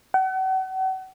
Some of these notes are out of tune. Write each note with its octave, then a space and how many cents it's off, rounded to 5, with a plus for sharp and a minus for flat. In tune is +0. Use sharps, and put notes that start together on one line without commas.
F#5 +40